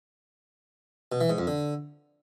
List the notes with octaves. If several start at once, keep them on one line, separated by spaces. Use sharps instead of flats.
B2
E3
G#2
F2
D3